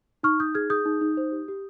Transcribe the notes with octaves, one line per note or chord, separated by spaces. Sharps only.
D#4 C#6 F6
D#4 D#6 G6
G#4 F6 G#6
G#4 D#6 G6
D#4
D#4
C5
G4
G4